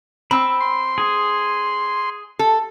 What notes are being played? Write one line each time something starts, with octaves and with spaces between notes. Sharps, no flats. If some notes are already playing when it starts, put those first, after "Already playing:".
C4 B5 E6
C6
G#4
A4